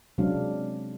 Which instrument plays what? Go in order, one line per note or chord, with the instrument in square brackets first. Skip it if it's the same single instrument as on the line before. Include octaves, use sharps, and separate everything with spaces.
[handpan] C3 F#3 G#3 C#4 D4 F5